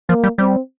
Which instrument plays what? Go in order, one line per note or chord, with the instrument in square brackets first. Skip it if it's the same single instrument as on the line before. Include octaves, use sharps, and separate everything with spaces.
[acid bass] F3 [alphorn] A#3
[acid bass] G3
[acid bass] G3 [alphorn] C4